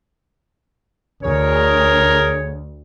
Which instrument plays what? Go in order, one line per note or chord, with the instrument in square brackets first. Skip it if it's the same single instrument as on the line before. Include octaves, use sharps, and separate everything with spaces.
[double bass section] D2 [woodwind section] G#4 C#5 [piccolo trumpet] A#4